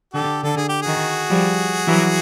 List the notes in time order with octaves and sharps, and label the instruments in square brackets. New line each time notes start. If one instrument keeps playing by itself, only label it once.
[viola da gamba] D3 [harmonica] G4 A4
[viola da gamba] D3 [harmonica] A4
[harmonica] G#4
G4
[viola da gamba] D#3 [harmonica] F#4 G#4
[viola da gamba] F3 G3
E3 F#3